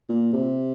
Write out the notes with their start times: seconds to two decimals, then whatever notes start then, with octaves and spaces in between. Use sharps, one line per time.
0.09 A#2
0.33 C3